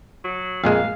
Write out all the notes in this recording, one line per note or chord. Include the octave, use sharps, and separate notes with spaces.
F#3
F2 A#2 G#3 F5